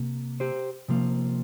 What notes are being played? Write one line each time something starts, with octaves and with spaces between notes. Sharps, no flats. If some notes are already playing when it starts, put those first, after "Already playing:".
Already playing: C3 A#3
G4 C5
C3 F3 A#3